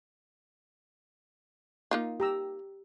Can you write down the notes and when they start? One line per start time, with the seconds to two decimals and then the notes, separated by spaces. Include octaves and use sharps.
1.91 A#3 D#4 F4
2.20 G4 A#5 E6